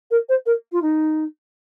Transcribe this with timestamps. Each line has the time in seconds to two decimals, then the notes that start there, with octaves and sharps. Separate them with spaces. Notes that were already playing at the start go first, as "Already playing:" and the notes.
0.11 A#4
0.29 C5
0.46 A#4
0.72 F4
0.82 D#4